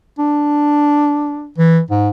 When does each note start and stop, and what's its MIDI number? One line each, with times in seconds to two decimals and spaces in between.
0.19 1.49 62
1.57 1.81 52
1.91 2.09 44